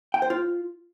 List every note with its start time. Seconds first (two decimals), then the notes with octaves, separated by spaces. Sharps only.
0.14 G5
0.22 C5
0.30 F4